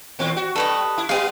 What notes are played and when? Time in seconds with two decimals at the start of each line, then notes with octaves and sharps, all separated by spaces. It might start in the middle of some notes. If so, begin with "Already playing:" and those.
0.19 D#2 A#2 C4
0.36 F#4
0.56 G2 A4 B4 D#5
0.98 E4
1.09 G3 B3 G4 G#4 F5